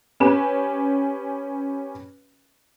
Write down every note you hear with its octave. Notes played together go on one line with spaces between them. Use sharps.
C#4 G4 B4 E7